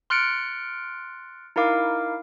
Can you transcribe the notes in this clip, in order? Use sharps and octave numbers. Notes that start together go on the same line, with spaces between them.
C6 F6 F#6 A6 C#7 D7
D#4 E4 A#4 F5 D6